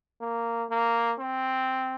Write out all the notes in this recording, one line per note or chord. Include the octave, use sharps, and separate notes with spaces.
A#3
A#3
C4